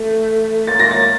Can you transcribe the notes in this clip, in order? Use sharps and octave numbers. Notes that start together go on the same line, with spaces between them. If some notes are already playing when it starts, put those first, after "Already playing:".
Already playing: A3
A#3 A6
A#6
A6